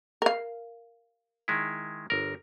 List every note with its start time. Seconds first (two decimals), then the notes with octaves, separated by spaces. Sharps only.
0.22 A#4 F5
1.48 D#3 G#3 E4
2.10 G1 A#4